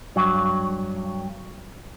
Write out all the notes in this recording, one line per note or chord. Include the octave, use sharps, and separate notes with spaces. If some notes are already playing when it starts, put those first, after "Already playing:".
G2 F#3